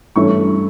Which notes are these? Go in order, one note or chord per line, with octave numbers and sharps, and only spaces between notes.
G2 E3 A3 C#4 E4 C#6